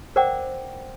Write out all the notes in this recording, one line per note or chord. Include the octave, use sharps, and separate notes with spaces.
A#4 C5 D5 F#5 G5 D6